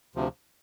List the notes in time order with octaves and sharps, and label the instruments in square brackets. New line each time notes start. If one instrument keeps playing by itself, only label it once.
[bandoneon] D2 C3 F3